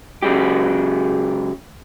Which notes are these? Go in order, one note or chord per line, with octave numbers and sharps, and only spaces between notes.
C#3 F#3 G#3 G4